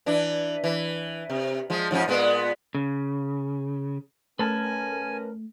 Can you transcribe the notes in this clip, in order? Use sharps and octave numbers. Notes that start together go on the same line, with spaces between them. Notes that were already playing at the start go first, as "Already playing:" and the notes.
E3 D4
E3
C3
F3 G#3
G#2 F3 C#4
A#2 G#3 B3
C#3
F#2 A3 C#4 A#4 B4 G#5 A5